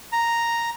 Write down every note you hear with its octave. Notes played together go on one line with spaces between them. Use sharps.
A#5